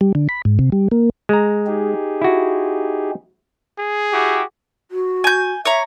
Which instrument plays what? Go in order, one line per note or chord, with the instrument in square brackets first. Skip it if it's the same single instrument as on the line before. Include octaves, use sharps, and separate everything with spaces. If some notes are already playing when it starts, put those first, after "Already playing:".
[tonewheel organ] G3
D3
B5
G#2
C3
G3
A#3
[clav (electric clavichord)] G#3 A#5
[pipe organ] D#4 G4 G#4
[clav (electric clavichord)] E4 F#4
[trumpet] G#4
[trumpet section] E4 F#4 G4
[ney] F#4
[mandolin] G#5 G6
[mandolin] C#5 A#5 [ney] E5